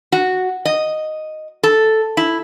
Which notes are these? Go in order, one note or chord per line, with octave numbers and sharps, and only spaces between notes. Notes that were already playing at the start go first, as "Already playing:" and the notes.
F#4
D#5
A4
E4